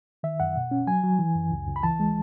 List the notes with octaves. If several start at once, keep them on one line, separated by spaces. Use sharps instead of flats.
D#3 E5
F#2 F#5
B2
C#4
F#3 G#5
F#3
E3
F#2
C#2
C#2
B5
E3 A5
G#3